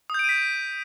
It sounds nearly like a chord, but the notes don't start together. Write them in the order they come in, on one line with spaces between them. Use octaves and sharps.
D#6 G6 D7 D#7 B6